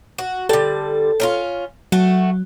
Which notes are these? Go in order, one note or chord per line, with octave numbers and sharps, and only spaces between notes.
F#4
D3 G3 A4
C#4 D#4 F4
F#3 A3 F#4